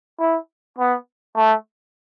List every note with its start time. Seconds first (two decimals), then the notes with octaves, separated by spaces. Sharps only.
0.20 E4
0.78 B3
1.36 A3